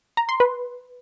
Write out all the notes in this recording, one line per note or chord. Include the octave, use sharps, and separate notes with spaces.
A#5
C6
B4